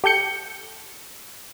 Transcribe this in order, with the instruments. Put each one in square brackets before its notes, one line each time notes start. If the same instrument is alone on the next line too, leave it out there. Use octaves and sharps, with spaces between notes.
[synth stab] G4 A4 G6 C#7